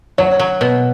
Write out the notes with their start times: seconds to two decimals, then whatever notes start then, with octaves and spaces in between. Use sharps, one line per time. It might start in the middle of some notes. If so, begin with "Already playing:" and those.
0.18 F#3 C#5
0.40 F#3
0.61 B2